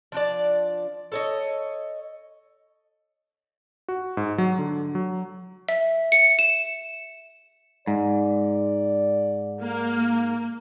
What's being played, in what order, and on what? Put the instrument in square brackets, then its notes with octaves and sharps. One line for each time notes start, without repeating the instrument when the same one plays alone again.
[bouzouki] F3 D4 D5
A4 C#5 D#5
[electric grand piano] F#4
G#2
F#3
D3
F#3
[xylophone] E5
C#7
E7
[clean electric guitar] G#2 [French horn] D5
[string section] A#3